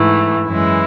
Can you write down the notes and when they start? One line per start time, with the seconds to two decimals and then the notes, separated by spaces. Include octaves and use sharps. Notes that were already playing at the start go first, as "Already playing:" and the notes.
Already playing: G#2 E3 A3
0.45 F#2 E3 G#3 E4